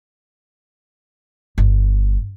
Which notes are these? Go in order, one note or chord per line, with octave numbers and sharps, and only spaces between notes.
G1